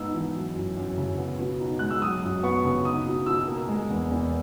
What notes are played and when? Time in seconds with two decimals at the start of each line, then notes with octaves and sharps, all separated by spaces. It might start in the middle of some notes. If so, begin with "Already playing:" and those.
Already playing: G#2 B3 D#4 E6
0.14 E3
0.34 F#3
0.55 F#2
0.77 F#2
0.98 C#3
1.18 B3
1.39 B2
1.60 D#4
1.79 G#3 F#6
1.91 E6
2.02 F#3 D#6
2.23 F#2
2.43 B3 C#6
2.64 C#3
2.85 D#4 D#6
3.06 B2
3.26 B2 E6
3.48 A#3
3.69 G#3
3.90 E2
4.11 E2